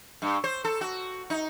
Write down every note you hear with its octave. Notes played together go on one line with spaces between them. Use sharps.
G2
C5
A4
F#4
D#4